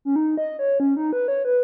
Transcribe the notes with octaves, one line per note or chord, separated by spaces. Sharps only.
C#4
D#4
D#5
C#5
C#4
D#4
B4
C#5
B4